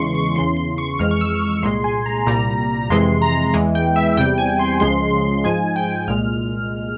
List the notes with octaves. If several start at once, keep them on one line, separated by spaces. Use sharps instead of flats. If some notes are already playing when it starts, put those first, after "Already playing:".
Already playing: E2 C#3 E3 G#3 C6 C#6
C#6
E2 C#3 E3 C6
C6
C#6
F2 E3 G#3 F6
C#6
E6
C#6
C2 A#2 G#3 C6
G#5
A#5
C2 A#2 G3 A#5
F2 C3 E3 G#3 C6
A#5
E2 E3 G#3
G5
E5
E2 C3 G3 G5
G#5
C6
C#2 C#3 F3 G#3 C6
G#2 F3 G#3 G#5
G5
C2 A#2 G#3 F6